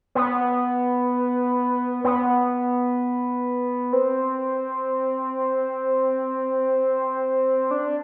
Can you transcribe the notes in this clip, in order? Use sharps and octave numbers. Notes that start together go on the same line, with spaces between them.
B3
B3
C4
D4